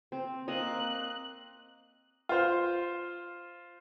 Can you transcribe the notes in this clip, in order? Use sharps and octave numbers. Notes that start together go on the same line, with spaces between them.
C4
A#3 C4 D#5 F#6
F4 C5